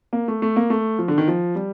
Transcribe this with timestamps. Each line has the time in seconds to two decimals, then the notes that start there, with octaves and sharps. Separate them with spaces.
0.13 A#3
0.28 A3
0.42 A3
0.56 A#3
0.70 A3
0.99 F3
1.08 D3
1.18 D#3
1.28 F3
1.55 G3